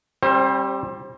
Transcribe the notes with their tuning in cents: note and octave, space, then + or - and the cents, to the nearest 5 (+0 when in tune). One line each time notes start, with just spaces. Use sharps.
G3 +0 C4 +45 C5 +25